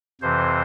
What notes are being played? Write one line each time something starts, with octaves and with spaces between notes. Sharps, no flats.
F2 C3 E3 C5